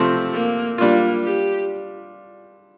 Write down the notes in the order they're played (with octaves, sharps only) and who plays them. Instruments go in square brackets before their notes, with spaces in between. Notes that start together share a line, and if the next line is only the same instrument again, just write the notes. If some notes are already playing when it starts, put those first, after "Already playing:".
Already playing: [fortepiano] C3 F3 A3 C4
[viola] A#3
[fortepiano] G3 D4 F4 [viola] A#3
[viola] G4